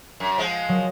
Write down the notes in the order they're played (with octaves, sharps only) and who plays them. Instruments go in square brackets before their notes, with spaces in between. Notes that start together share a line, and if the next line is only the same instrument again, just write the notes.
[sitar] F#2
F3 G#3
[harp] F#3